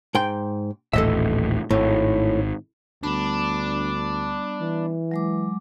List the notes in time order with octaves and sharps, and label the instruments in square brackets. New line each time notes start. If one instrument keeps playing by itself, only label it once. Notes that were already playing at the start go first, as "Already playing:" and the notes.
[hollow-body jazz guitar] G#2 G5 C6
[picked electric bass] D#1 A1 A2 [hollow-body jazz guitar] A4 D#5 E5
[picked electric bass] G#1 [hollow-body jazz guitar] A2
[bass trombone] D2 [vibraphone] G3 B3 B5 [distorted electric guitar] D4
[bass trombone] E3
[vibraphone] F#3 G#3 D6